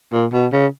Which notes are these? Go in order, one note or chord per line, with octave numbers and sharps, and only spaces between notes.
A#2
B2
C#3